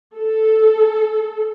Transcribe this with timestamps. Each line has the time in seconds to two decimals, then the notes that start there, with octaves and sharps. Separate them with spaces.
0.17 A4